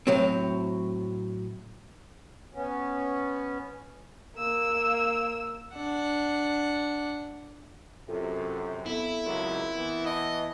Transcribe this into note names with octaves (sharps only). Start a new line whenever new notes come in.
A2 F#3 C4
B3 C#4
A#3 E6
D4 F#5
F#2 C3 F4 A4
B3 C4 E4 A4
C#2 F#3 C4 A#4 C6
E3 B3
D#5 F#5 A5 B6